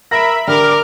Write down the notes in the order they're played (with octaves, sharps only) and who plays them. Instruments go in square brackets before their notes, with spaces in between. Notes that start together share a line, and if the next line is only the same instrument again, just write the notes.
[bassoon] A#4 [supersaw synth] E5 B5 [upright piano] A#6 D7
[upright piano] D3 [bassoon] G3 [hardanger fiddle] A#4 [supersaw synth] D6 F6